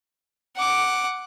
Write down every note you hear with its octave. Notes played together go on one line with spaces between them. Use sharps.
F#5 D6